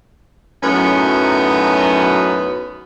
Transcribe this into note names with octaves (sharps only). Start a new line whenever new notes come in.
F#2 A2 F#3 B3 C#4 D#4